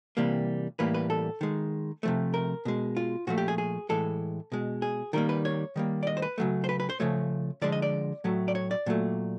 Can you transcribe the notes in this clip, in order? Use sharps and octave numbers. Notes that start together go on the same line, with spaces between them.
C3 E3 G3 A#3
A2 E3 G3 A#3 B4
B4
A4
D#3 G#3
C3 F3 A3
A#4
B2 G#3
F4
A#2 F3 A3 F#4
G4
G#4
G#4
A2 E3 G#3 A4
B2 G#3
G#4
D#3 G3 A#3 A#4
B4
C#5
D#3 G3 A#3
D5
D#5
C5
B4
C#3 F#3 A3
C5
B4
B4
C5
C#3 F3 A3 C#5
D3 F3 G#3 D5
D#5
D5
A2 F#3 A3
D5
C#5
D5
A#2 F#3 A3